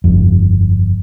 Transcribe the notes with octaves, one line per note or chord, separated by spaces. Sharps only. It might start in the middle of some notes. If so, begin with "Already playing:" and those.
G1 F2